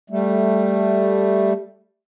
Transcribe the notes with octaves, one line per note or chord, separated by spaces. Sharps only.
G3 A3